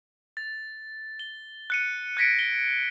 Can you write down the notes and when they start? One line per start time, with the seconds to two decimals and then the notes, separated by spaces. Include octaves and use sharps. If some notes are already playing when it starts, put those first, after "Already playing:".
0.37 A6
1.20 G7
1.70 F#6 C#7 D#7
2.17 F#6 G#6 A#6 B6 C#7 D7
2.39 G7